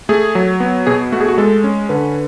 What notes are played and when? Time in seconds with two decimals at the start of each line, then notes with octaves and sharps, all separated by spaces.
0.09 A3 G#4
0.35 F#3
0.60 B3
0.87 B2 G#4
1.12 A3 F#4
1.20 G#4
1.28 F#4
1.38 G#3 A4
1.64 C#4
1.89 D3 B4